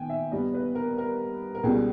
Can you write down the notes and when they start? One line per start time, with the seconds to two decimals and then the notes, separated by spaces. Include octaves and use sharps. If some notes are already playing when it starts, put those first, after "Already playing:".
Already playing: D#3 B3 G5 G#5
0.10 E5
0.32 G2 G3 B3 D#5
0.54 B4
0.75 A#4
0.98 A#4
1.55 A#4
1.63 C#2 B2 G3 G#4